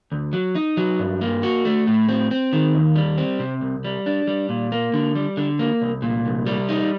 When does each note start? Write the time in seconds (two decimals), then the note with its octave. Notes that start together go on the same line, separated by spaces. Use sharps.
0.12 D2
0.33 F#3
0.55 D#4
0.77 F#3
0.99 G2
1.21 A#3
1.43 F#4
1.65 A3
1.87 A2
2.09 C4
2.31 C4
2.53 D#3
2.75 D#2
2.96 G3
3.18 C4
3.39 C3
3.61 C2
3.84 G3
4.06 D4
4.27 G3
4.49 A#2
4.72 A#3
4.94 D3
5.15 G3
5.37 D3
5.59 A#3
5.81 C2
6.02 A#2
6.25 C2
6.47 G3
6.69 D#4